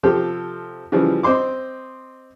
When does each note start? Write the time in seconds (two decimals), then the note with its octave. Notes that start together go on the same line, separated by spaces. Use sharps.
0.03 C3 F3 G4 A4
0.92 C#3 E3 F3 G3
1.23 C4 C5 D#5 C6 D6